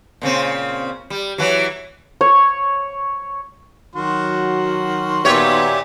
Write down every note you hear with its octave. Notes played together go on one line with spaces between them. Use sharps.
A#2 C#3 C4
G3
E3 F#3
C#5
D#3 F#3 F#4 C6
A#2 B3 G4 C#5 E5